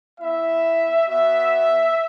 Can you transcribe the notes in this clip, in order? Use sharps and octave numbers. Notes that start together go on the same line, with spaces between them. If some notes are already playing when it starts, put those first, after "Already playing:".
B3 E4 E5
B3 F#4 E5